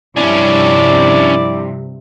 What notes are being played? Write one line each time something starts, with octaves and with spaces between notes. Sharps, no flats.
G2 C3 F3 C#4 D4 E4 D5